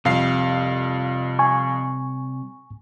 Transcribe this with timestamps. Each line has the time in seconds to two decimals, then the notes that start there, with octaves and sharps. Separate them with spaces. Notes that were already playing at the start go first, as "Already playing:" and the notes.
0.05 F2 C3 G3 F5 C7
1.39 G#5 C#6